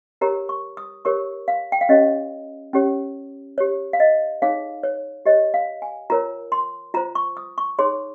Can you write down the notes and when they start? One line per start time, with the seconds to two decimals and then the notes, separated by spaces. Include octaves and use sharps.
0.21 G4 A#4 C#5 A#5
0.49 C#6
0.77 D#6
1.05 G4 A#4 C#5 C#6
1.48 F5
1.72 G5
1.81 F5
1.89 C#4 G4 C#5 D#5
2.73 C#4 G4 C#5
3.58 G4 C#5
3.93 F5
4.00 D#5
4.42 D#4 G#4 C#5 F5
4.84 C#5
5.26 G4 C#5 D#5
5.54 F5
5.82 G#5
6.10 F4 A#4 C#5 A#5
6.52 C6
6.94 F4 C5 A#5
7.15 C#6
7.37 D#6
7.58 C#6
7.79 D#4 G#4 C#5 C6